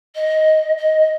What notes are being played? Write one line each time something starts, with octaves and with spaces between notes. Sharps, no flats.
D#5
D#5